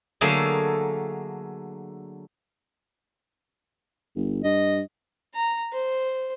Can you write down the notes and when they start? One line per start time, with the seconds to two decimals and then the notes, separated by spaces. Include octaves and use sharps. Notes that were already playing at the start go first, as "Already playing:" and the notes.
0.21 D3 F#3 A3 A#3 G#4 A4
4.16 G1
4.44 G2 D#5
5.35 A#5
5.73 C5